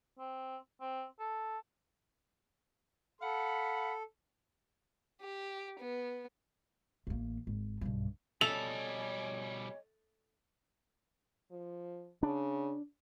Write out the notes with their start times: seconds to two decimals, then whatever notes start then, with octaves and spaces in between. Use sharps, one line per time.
0.19 C4
0.81 C4
1.19 A4
3.21 A4 F5 F#5 B5
5.21 G4
5.79 B3
7.07 A1 A#3
7.47 G#1
7.81 B1 G2
8.41 B2 G3 A4 C#5 D#5 E5 G#5 F7
11.52 F3
12.23 C#3 D4